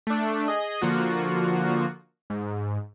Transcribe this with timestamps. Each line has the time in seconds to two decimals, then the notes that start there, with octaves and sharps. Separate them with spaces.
0.07 A3 D4
0.48 G#4 D#5
0.82 D3 F3 A#3 F4 F#4
2.30 G#2